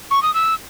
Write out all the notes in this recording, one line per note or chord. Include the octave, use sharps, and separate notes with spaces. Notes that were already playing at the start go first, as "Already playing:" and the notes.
C#6
D#6
E6